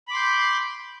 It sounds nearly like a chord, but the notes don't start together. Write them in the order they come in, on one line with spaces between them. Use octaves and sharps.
B5 D6 C6 G6